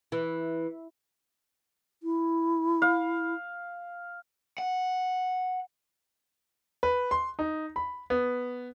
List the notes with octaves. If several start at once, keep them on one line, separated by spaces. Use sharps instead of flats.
E3
E4
F5
F#5
B4
C6
D#4
B5
B3